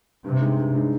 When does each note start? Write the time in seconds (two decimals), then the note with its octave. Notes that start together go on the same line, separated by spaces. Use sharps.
0.24 G2 C3
0.41 D3 G#3 D#4
0.59 G2
0.74 D3 G#3 D#4